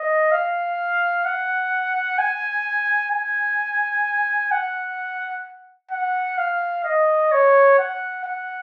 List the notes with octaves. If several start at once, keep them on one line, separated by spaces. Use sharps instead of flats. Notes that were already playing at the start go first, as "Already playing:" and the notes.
Already playing: D#5
F5
F#5
G#5
G#5
F#5
F#5
F5
D#5
C#5
F#5
F#5